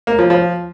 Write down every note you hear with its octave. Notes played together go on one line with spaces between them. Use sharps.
A#3
F3
F3